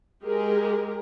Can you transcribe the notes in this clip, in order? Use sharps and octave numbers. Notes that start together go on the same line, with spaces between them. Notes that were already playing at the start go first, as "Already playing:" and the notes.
G#3 G4 G#4 A#4